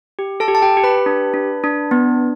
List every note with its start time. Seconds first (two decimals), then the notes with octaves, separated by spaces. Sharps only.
0.19 G4
0.40 A4 A5
0.48 G4
0.55 A5
0.62 G4 G5
0.77 G4
0.83 B4 B5
1.06 D4
1.34 D4
1.64 D4
1.91 B3